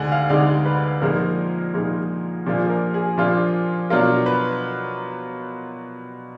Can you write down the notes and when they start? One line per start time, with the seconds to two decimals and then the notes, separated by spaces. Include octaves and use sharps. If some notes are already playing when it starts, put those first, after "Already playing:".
Already playing: D2 D3 G#3 D#4 F#5 G#5
0.12 F5
0.29 D2 D3 G#3 D#4 D5
0.65 B4
1.01 A#2 F3 G#3 D#4 A#4
1.74 A#2 F3 G#3 D#4
2.46 A#2 F3 A#3 D4 F4 G#4
2.63 G#4
2.70 A#4
2.94 G#4
3.18 A#2 F3 A#3 D4 F4
3.90 B2 F#3 D4 F4 A#4
4.26 B4